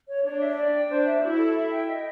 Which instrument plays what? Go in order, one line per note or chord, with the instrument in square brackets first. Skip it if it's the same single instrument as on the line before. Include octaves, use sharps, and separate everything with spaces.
[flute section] C#5
[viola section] D4 [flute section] C#5
[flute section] E5
D5
G5
[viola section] D4 [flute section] C5
[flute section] E5
[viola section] E4 [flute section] F#4
[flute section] A4
E5
G5
D#5